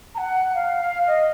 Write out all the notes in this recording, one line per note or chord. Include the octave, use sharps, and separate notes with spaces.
A#5
F#5
F5
F5
D#5